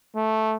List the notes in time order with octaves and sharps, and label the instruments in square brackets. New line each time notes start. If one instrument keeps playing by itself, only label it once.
[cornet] A3